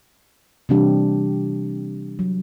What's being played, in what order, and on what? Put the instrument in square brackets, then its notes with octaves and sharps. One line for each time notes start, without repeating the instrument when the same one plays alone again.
[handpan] C3 E3 G3 C4 D4 G4
F#3